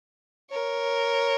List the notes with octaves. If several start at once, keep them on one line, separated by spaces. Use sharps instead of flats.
A#4 C#5